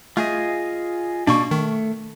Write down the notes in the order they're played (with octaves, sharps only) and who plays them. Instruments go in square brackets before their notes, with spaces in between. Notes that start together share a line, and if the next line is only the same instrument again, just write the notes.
[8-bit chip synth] A3 [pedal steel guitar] F4 G#4 D#5
[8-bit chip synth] B2 A#3 [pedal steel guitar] D4 C#6
[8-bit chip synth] D#3 [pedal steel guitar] A3